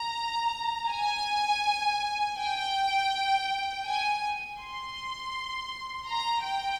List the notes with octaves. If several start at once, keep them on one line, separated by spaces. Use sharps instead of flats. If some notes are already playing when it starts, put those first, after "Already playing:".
Already playing: A#5
G#5
G5
G#5
C6
A#5
G5